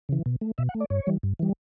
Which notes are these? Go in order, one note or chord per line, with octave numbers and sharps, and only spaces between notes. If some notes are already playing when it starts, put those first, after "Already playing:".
C#3 E3
B2
A3
B2 E5
F#5
A3
D5
G2 C#5
E3 G3
G2
E3 G3